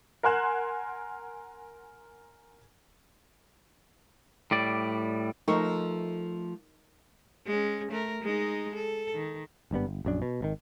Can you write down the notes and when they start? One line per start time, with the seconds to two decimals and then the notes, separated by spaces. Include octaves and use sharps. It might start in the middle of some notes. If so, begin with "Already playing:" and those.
0.23 A#4 F#5 G#5 C6 F#6 E7
4.51 A2 G3 D5
5.48 F3 A3 D#4 A#4 C#6
7.47 G#3 C#4
7.92 A3 A#4
8.23 G#3 D#4
8.75 A4
9.14 D#3
9.71 G#1 G2 G3 B3
9.87 G1
10.05 A#1 F#2 D4
10.22 B2
10.41 G#1 B2 D#3